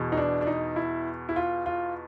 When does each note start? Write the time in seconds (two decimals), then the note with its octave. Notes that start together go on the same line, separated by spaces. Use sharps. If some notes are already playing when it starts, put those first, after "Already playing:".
Already playing: E2 B2
0.12 D#4
0.17 D4
0.41 D4
0.47 D#4
0.76 E4
1.29 E4
1.36 F4
1.66 F4